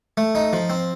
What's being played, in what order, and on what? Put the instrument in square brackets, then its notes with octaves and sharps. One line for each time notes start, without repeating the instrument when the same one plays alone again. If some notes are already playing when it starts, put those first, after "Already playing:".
[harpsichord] A3
D#4
F3
C4